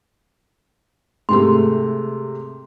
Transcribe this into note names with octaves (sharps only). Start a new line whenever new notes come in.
G#2 C3 A3 C6